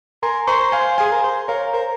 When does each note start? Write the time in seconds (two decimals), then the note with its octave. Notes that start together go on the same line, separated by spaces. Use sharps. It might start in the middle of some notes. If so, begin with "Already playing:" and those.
0.23 A#4 G#5 C6
0.47 C5 A#5 C#6
0.72 F5 G#5
0.98 G#4 F5 G#5
1.11 A#4
1.23 C5
1.48 A#4 C#5 F5
1.73 A#4 C5